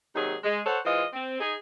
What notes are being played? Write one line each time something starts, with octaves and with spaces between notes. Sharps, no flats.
D#2 C3 F#3 D#4 G#4
G#3
A4 C5 C#5 F#5
E3 G#3 F4 C5 D#5
C4
D#4 G#4